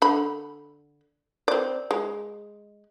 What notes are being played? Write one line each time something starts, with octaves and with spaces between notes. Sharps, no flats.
D3 B5
C4 D5
G#3